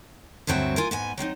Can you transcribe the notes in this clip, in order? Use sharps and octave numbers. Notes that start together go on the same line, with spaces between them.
D2 G2 F#3 C4 F#4 E5
F4 A#4 G#5
G#2 B3 G#5
F#3 C4 C#4 D#4